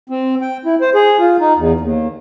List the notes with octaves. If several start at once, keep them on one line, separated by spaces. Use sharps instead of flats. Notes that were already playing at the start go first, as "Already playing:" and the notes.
C4
G5
E4
C5
G#4
F4
D#4
E2
D#2